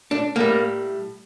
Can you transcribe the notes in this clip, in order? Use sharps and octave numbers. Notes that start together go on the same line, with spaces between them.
D4
A2 G3 A#3